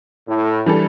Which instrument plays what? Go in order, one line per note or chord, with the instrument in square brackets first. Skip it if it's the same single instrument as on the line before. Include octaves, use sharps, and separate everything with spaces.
[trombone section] A2
[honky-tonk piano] E3 G3 D4 A4